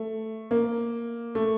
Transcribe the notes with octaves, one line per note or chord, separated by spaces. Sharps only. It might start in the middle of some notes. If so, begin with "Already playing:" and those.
Already playing: A3
A#3
A3